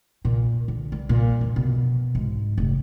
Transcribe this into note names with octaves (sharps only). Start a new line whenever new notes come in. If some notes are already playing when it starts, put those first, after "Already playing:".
A#2
D3
G3
A#2
F2
B2
G#2
F1